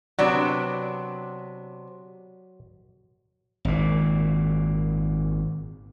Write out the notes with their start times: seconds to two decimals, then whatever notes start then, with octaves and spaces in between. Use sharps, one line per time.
0.19 C3 F#3 B3 D4 D5
3.65 G#1 A#2